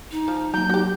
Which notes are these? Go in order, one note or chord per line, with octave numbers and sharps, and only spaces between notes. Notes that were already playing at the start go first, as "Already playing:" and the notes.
D#4
F3
F#3 A#3 A#5 G6
F#4 G4